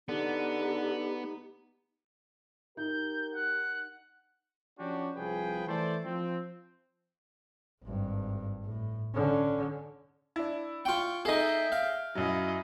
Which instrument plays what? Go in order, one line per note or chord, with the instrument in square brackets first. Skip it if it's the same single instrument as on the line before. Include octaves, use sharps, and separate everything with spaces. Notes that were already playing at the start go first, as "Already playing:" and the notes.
[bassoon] D3 [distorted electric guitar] B3 [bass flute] D#4 [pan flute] G4
[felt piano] D#4 [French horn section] G4 A#4 [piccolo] G6
[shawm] F#5 [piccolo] F#6
[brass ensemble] F3 C#4 D4 F#4 G4
C2 F3 G#4 B4 G5
E3 A3 A4 C5 D5
F3 C4
[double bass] G#1 G2
A2
D3 C#4
[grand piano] D4 E4
[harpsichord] F4 G5 [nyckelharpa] C#6
[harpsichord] D#4 A4 [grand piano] G#4 D#5 [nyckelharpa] E5 G5
[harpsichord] F5
[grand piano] F#2 F#3 [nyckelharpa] E4 D#5